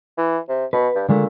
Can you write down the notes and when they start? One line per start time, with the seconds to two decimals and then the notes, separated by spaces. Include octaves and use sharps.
0.18 E3
0.49 C3
0.73 B2 B4
0.95 G2
1.09 A#2 D3 G#3 A3